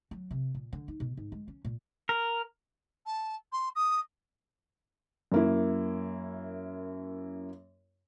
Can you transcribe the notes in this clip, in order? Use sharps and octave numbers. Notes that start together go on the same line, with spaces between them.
F#3
C3
A#2
D3
D#4
B2
G#2
G#3
C#4
A#2
A#4
A5
C6
D#6
F#2 A#3 E4